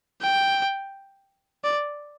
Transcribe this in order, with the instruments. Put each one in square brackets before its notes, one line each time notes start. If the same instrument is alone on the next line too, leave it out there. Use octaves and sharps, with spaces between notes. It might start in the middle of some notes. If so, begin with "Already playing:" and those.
[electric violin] G5
D5